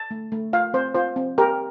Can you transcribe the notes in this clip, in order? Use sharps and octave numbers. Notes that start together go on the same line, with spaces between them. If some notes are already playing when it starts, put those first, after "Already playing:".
Already playing: A5
A3
A3
F4 F5
C4 C5
F4 C5
C4
G4 A#4